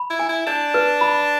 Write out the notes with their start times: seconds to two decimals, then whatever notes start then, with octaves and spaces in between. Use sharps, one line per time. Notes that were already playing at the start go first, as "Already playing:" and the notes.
Already playing: B5
0.10 E4
0.19 G#5
0.29 E4
0.47 D4 D5
0.74 B4
1.01 B5